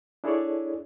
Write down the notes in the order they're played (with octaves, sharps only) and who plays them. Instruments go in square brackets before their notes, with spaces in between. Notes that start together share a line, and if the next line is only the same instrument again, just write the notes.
[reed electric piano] D4 E4 G#4 A4 C#5 D5